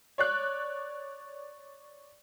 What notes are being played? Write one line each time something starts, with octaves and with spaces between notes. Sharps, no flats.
C#5 D5 F#6